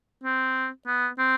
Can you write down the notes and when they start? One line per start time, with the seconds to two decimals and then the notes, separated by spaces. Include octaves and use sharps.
0.24 C4
0.87 B3
1.18 C4